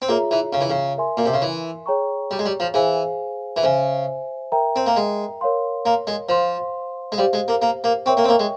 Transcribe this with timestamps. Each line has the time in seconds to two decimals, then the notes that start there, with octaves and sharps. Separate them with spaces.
0.02 C4
0.09 A#3 F4 G#4 C#5 E5 A#5
0.31 E3
0.53 C#3
0.61 E3
0.70 C#3
0.97 A#4 E5 G#5 C6
1.17 A#2
1.25 C3
1.34 C#3
1.42 E3
1.86 G#4 C#5 G5 A#5 C#6
2.31 G3
2.39 G#3
2.45 G3
2.60 F3
2.74 E3 G#4 C5 F5 G#5
3.56 E3
3.63 C#3 C5 E5 G#5
4.52 A#4 E5 G5 A#5
4.76 C4
4.86 A#3
4.97 G#3
5.41 A#4 C#5 F5 C6
5.86 A#3
6.07 G#3
6.29 F3 C5 F5 C6
7.12 G#3
7.18 G3 G4 C5 F5
7.33 G#3
7.48 A#3
7.62 A#3
7.84 A#3
8.06 C4 A#4 C#5 E5 G5 C#6
8.17 A#3
8.24 C4
8.29 A#3
8.39 G#3